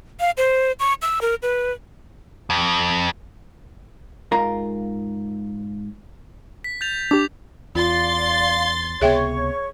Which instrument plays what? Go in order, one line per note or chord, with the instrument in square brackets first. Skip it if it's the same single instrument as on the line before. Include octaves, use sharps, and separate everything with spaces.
[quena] F5
C5
C#6
E6
A#4
B4
[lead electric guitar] F2
[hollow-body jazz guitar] G#2 F4 A#4 F5 A#5
[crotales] B6
G6 A6 F7
[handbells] D4 G4 [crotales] D6
[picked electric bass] E2 [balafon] F4 [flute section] D5 F5 [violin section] C6 A6
[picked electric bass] C#2 C3 B3 [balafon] G#4 E5 G5 [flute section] C#5 C#6